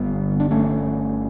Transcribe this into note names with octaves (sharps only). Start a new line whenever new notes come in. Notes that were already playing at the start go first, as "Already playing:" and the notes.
Already playing: G1 D3 G3 B3
D4
A3 C#4